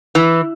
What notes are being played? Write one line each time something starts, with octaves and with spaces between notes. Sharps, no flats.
E3